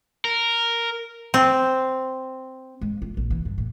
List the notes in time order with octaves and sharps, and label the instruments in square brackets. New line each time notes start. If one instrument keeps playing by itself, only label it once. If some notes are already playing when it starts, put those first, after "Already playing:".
[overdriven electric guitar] A#4
[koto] C4
[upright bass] G#3
F4
A#1
E3
G2
A2